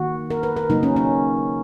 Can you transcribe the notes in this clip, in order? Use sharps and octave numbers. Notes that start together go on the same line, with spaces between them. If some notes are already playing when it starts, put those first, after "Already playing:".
Already playing: D#3 A#3 F#4
A#4
B4
A#4
C#3 F#3 A#3 D#4
C#4
C#4